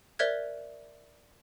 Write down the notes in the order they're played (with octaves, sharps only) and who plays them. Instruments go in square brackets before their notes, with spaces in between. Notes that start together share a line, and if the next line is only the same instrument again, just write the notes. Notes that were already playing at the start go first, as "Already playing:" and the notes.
[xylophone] A#4 C5 D5 E5 F#6 G#6